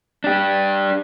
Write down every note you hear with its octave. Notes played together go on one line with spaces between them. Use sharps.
D4 G4